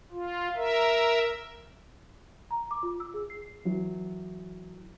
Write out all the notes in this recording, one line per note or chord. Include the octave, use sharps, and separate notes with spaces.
F4
A#4 E5
A#5
D6
F4
E6
G#4
C7
E3 F#3